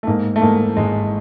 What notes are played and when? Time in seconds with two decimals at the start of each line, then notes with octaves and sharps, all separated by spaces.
0.03 A3
0.07 G#2 A#3
0.36 A3
0.42 G#2 A#3
0.77 G#1 G#3